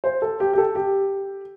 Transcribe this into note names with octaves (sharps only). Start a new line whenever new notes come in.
C5
A4
G4
G4
A4
G4